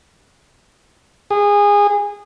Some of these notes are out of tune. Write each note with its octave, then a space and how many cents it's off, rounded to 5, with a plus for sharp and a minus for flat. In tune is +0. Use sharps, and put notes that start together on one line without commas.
G#4 -25